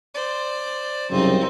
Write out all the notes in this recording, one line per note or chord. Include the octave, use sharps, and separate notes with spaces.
C5 D5
C2 F#2 C#3 C4 D#4